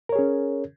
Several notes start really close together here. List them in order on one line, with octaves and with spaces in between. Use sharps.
A#4 C#5 G#4 C#4